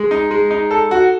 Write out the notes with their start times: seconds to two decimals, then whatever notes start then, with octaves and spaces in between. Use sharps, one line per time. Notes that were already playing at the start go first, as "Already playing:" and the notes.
Already playing: G#3
0.11 D#4
0.31 G#3
0.51 D#4
0.71 A4
0.91 F#4